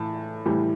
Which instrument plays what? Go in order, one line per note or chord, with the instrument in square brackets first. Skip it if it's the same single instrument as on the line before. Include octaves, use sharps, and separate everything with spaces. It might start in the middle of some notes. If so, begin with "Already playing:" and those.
Already playing: [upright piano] A2 E3 A5
A2 E3 G3